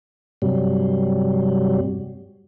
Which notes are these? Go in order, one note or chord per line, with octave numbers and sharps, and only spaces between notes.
G2 C3 F#3 G3